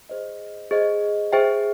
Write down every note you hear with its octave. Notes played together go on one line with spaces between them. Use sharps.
G#4 C5 D#5
G#4 C5 D#5
G#4 C5 E5 G5